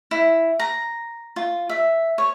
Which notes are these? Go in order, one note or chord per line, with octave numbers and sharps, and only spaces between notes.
E4
A#5
F4
E5
C#5